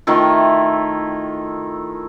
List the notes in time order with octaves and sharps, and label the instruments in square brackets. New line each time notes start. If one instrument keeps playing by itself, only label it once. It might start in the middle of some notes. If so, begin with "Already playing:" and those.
[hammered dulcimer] D#3 A3 E4 F4